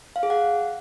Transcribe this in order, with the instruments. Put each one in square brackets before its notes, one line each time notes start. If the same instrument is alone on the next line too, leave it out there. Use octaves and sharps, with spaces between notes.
[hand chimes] F5
G#4
F#5